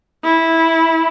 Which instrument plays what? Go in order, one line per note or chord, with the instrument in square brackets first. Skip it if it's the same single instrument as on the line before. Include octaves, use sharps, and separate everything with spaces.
[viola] E4